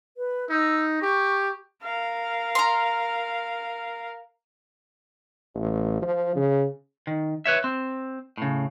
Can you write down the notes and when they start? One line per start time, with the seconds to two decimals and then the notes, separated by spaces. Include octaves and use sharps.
0.17 B4
0.50 D#4 E6
1.02 G4 C#6
1.83 A#4 F5
2.55 A#5 C6
5.55 A1
6.02 F3
6.36 C#3
7.07 D#3
7.46 B4 C#5 E5
7.64 C4
8.38 A2 C#3